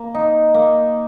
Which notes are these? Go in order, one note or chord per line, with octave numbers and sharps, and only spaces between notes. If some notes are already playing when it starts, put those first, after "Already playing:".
Already playing: A#3
D#4
A#3